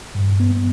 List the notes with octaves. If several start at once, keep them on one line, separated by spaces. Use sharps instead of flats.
G2
B3